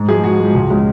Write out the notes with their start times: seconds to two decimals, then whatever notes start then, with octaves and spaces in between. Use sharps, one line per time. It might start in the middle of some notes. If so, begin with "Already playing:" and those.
Already playing: G#2
0.08 F3 G#3 G#4
0.23 G#2 F#4
0.39 F3 G#3
0.54 C#2
0.70 C#3 G#3